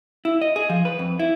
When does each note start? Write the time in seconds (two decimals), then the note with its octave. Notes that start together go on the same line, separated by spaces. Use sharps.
0.25 E4
0.41 D#5
0.56 G#4
0.69 F3
0.85 B4
0.99 F2
1.19 E4